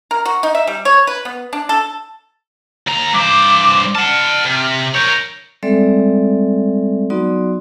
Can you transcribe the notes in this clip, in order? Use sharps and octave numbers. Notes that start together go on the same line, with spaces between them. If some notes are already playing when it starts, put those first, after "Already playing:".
A#4
F#4
D#4
E5
G3
C#5
B4
B3
D4
A4
D#2 A#5
G2 C5 D6
F#5 A5 F6
C3
A#4 C#5 G6
G3 G#3 C4 A4 D5 E5
F#3 B3 D#4 F#4 D5 C6